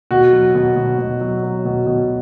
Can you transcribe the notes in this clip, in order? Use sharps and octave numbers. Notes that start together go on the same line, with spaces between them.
B2 F#4
F#3
B2
B2
B2
F#3
F#3
B2
B2